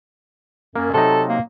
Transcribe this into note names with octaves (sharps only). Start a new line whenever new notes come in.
F#2 A#3
C3 F#3 D#4 A4
A#3